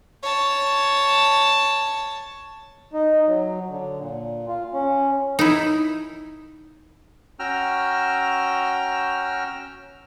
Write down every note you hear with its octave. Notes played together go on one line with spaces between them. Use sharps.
C#5 A5
D#4
F#3
D3
A#2
F4
C#4
D#4 E4
C#4 F#4 G5 A#5 E6 F6